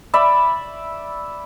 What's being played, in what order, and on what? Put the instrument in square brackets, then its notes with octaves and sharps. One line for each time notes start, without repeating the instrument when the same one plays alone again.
[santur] D5 E5 B5